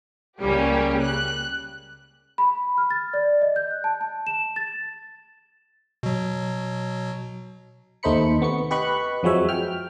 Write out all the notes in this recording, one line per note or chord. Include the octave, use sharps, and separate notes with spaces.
C#2 C#3 G3 A#3 C#4 G4
F#6
B5
F6
A6
D5
D#5
G6
F#6
A5
A5
E7
A6
B2 F#3
D#2 A3 D#4 C5 B5 C#7
C3 B3 C#6 C#7
G4 B4 D#5 B5 C#6 F#6
F2 F3 F#3 G#3 C#5 E5
G5 F6